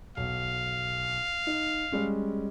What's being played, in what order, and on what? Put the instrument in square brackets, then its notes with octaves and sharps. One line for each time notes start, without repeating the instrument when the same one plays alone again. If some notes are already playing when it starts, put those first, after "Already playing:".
[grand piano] B1 [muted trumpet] F5
[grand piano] D#4
G3 G#3 C#4